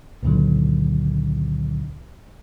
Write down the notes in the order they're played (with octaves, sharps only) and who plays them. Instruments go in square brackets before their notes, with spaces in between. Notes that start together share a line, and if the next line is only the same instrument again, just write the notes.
[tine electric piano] C#2 F#2 A#2 D3 D#3 F#3